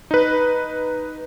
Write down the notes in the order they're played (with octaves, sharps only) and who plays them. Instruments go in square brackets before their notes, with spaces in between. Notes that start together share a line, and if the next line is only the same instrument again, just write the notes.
[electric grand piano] D#4 B4